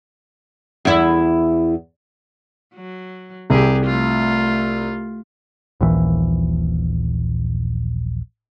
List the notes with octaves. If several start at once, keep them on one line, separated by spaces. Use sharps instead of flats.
E2 E4
F#3
C2 G4 G#4
A3 F4
D#1 A#1 E3